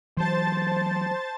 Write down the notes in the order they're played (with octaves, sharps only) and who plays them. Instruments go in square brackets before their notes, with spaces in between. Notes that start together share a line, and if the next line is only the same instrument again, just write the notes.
[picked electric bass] E3 F#3 [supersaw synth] C5 A5 A6